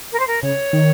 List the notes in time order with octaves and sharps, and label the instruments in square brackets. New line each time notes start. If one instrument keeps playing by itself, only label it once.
[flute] A#4
C5
A#4
[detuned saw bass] C#3 [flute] C#5
[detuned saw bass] D#3